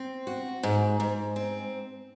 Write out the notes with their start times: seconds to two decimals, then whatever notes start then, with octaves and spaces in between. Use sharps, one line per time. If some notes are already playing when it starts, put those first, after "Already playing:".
Already playing: C4
0.27 F#4
0.63 G#2
1.00 G#2
1.36 C4